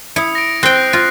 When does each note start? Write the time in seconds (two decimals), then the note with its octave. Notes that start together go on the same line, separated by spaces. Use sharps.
0.16 E4 D#6 C#7
0.35 A#6 D7
0.63 C4 G5 F#6 C7
0.93 F4 A#6